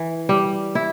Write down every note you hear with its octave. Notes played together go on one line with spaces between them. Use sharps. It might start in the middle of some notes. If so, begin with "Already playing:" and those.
Already playing: E3
G3
E4